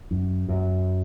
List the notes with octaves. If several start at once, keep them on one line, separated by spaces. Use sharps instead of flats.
F#2
F#2